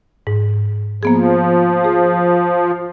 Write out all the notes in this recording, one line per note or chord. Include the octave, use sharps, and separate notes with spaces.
G#2
F3 A#3 B3 G#4
G#4